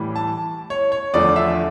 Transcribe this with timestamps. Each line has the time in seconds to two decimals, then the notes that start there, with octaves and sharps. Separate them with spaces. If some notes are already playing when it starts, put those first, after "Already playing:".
Already playing: A2 E3 G3
0.16 A5
0.70 C#5
0.92 C#5
1.14 E2 D3 F3 A3 D5
1.36 E5